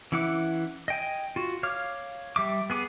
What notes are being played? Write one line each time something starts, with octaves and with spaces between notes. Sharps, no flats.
E3 C#4 E4 F#5 D6
D#5 G5 G#5
F4 F#4
C#5 F5 D6 F6
G3 E5 D6
B3 G#4 D6